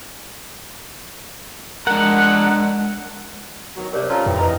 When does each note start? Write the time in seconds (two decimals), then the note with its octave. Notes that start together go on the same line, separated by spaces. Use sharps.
1.87 G#3 D4 A#4 F#5
3.76 B2 D#3 F#3
3.93 C3 G3 A#4 C#5 D5
4.10 C#4 F4 A4 A#5 C6
4.26 F2 E3 G4 G5 D#6
4.40 E4 B4 D#5